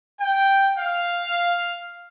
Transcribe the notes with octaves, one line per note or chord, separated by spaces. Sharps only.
G5
F5